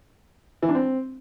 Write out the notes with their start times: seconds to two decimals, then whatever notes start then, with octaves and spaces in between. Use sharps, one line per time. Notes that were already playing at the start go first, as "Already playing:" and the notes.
0.62 E3
0.69 D4
0.75 C4